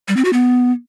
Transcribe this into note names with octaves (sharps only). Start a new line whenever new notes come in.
G3
C4
F#4
B3